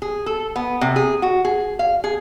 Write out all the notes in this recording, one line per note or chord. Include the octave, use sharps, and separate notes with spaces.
G#4
A4
B3
C3
G#4
F#4
G#4
F5
G#4